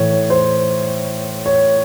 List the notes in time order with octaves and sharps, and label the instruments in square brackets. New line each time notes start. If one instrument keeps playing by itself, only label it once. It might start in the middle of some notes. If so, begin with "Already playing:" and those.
Already playing: [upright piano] A2 E3 C#5
C5
C#5